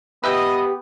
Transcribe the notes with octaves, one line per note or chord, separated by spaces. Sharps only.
B3 G4 B4 D#5 E5 G5